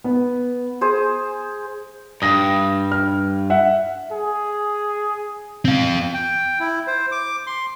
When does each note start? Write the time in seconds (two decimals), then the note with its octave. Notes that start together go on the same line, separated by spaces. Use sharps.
0.04 B3
0.81 G#4 C5
2.22 G2 D#6 A#6
2.92 F6
3.50 E5 F#5
4.12 G#4
5.65 C4 F5
6.14 G5
6.60 E4
6.87 C5
7.12 D6
7.47 C6